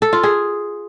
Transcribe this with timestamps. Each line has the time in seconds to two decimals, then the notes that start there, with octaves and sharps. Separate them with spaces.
0.02 A4
0.13 F4
0.23 G#4